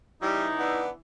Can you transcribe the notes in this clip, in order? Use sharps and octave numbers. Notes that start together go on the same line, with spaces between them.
C#3 E3 G3 D#4 E4
B3 D4